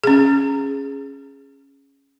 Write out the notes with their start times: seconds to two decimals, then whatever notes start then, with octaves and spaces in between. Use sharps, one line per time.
0.04 C#4 G#4